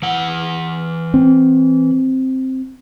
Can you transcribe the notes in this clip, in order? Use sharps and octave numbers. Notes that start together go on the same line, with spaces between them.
E3 F#5
C4